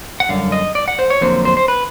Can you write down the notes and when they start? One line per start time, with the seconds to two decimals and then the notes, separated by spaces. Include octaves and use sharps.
0.20 F#5
0.29 F#2 D3 G3 F5
0.52 D#5
0.75 D5
0.88 F#5
0.99 C5
1.10 C#5
1.21 F2 D3 F#3 A#3 C5
1.45 C5
1.57 C5
1.68 B4